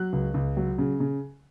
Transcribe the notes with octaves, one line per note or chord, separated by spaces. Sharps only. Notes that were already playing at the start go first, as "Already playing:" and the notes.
Already playing: F#3 F#6
C#2
C#2
F#3
C#3
C#3